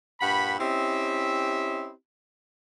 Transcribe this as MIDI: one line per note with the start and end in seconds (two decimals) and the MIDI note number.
0.21 0.54 43
0.21 0.54 46
0.21 0.54 78
0.21 0.54 83
0.59 1.91 60
0.59 1.91 61
0.59 1.91 64
0.59 1.91 67
0.59 1.91 75
0.59 1.91 76